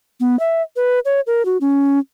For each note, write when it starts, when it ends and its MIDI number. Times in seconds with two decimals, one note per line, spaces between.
0.20 0.38 59
0.39 0.62 76
0.76 0.99 71
1.05 1.21 73
1.27 1.45 70
1.45 1.57 66
1.61 1.99 61